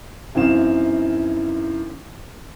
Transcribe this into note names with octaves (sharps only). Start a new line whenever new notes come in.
F#2 E3 C4 D#4 F5 E7